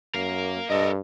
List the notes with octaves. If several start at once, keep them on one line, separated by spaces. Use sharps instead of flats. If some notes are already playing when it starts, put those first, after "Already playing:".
F#2 A#4 F5
G2 A4 A#4 D#5